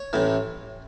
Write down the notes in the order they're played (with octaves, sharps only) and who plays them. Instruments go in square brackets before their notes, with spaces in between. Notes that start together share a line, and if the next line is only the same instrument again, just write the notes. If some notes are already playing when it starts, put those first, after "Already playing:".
Already playing: [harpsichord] C#5
A1 A2 E3